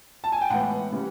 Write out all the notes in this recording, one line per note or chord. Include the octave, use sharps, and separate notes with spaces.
A5
G#5
G5
A2 E3 G#3 B3 F#5
C#3 E3 G3 A#3